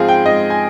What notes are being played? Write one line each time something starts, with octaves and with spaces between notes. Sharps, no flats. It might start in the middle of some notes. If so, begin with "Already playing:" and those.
Already playing: G#2 F3 C4 G#4 F5
G5
G#2 D#5
G#5